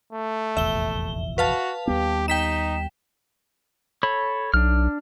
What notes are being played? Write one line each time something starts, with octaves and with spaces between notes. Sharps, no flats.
A3
F1 A#1 E2 E5 G7
F#4 B4 F5 A5
D#2 G3 B3 G4
D#4 G5 B6 E7
A4 C#5 B5
B1 D4 F6